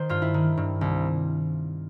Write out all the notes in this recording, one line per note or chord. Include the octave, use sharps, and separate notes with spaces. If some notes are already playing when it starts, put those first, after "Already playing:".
Already playing: D#3 C5
G2 F4
E4
D#3
G2
C2